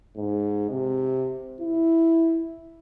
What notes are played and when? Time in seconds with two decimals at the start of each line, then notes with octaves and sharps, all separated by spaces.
0.16 G#2
0.70 C3
1.60 E4